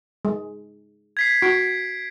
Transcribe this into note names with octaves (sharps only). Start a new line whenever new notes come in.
G#3
G#6 B6 C7
F#4 D7